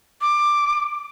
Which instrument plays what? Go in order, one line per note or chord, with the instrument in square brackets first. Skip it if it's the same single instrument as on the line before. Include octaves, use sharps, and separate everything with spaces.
[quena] D6